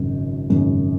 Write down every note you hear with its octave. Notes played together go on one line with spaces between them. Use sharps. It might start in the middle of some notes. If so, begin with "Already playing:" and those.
Already playing: G#1 F#2 C#3
G#1 F#2 C#3